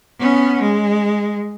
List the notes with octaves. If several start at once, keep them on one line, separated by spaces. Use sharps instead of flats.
B3 C#4
G#3